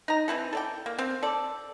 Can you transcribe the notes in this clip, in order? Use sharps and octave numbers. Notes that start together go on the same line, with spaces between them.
D#4 A#5
E3 C4 E4 A4
A4 D5 G5
A#3
C4
A4 D5